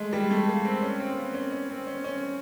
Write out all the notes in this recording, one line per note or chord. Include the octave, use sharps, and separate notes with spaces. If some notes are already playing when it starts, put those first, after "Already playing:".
Already playing: G#3 A3
G3
A3
A#3
C4
C#4
C4
A#3
B3
C#4
C#4
C4
C#4
C#4